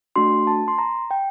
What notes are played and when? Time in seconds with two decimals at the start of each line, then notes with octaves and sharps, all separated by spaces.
0.16 A3 D4 F#4 C6
0.47 A5
0.68 C6
0.78 A#5
1.11 G5